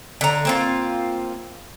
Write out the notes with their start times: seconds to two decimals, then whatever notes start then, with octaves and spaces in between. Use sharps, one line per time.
0.21 D3 A#5
0.45 A#3 C4 F4